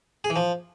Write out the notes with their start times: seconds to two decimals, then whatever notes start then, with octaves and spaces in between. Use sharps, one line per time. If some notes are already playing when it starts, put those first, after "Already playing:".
0.24 G#4
0.30 E3
0.36 F3